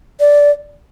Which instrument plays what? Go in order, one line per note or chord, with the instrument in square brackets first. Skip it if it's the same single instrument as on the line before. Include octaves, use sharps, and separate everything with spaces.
[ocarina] D5